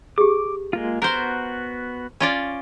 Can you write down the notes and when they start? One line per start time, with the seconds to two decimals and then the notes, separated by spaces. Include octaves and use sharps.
0.18 G4 G#4 D6
0.73 G#3 A#3 F4
1.02 B3 F#4 A#4 C5 G6
2.20 C#4 F4 D5